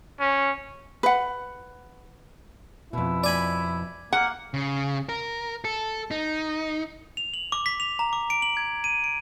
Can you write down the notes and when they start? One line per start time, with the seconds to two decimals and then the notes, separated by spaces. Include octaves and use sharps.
0.20 C#4
1.03 B4 F#5
2.93 F2 B2 E4
3.24 D5 G#5 B5
4.13 A#3 F#5
4.54 C#3
5.09 A#4
5.65 A4
6.11 D#4
7.17 F7
7.34 F#7
7.52 D6
7.66 B6
7.80 F7
7.99 A#5
8.13 D6
8.30 D7
8.42 F#7
8.57 G#6
8.84 D#7
9.04 D7